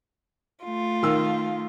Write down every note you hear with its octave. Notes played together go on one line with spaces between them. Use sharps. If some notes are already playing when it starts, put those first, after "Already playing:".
A3 F4
D#3 E6